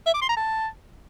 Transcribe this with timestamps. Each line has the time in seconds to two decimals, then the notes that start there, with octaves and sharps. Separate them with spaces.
0.06 E5
0.14 D6
0.21 C6
0.29 A#5
0.36 A5